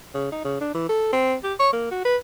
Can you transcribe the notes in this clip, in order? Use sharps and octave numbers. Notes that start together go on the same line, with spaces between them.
C#3
D#4
C#3
D4
E3
A4
C4
G4
C#5
A#3
F#4
B4